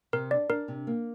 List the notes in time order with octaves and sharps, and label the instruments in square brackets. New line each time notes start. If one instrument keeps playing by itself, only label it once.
[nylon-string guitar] C3 [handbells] A#4
[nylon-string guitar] D4 [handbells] D5
[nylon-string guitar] D4 [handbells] A#4
[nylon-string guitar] C3
A#3